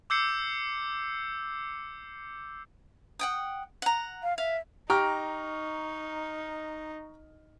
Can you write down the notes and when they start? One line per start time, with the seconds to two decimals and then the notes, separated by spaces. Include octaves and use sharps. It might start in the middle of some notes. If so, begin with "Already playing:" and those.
0.10 D6 E6 G6 C7 C#7
3.19 F#5 G5 D#6
3.82 F#5 A#5
4.23 F5
4.38 E5 F5
4.90 D#4 G4 A#5 C#6 F6